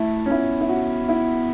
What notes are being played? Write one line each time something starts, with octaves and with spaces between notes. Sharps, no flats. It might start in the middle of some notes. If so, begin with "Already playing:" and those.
Already playing: A3 E4
C#4
B3 E4
E4
F#4
E4